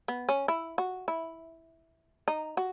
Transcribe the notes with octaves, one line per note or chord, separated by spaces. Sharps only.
B3
C#4
E4
F#4
E4
D#4
F#4